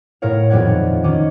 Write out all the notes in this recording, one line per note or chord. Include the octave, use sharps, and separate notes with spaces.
A2 B3 A#4 C#5 F5
D#1 F2 B3 D5 F#5 G#6
D#3 C#4 D6